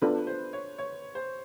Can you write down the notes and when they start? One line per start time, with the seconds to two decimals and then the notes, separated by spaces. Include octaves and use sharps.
0.02 B3 D4 F4 A4 B4 D5
0.27 C5
0.53 C#5
0.78 C#5
1.15 C5